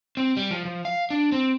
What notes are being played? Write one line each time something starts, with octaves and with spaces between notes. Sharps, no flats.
C4
G3
F3
F3
F5
D4
C4